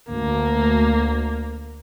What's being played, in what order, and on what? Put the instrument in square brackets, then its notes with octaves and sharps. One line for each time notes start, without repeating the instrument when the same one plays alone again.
[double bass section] D2 [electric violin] A#3